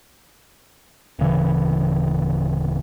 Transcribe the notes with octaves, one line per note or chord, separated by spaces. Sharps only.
D1 C#3 E3